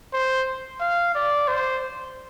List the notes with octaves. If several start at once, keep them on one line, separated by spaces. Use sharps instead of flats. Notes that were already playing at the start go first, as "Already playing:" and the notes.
C5
F5
D5
C5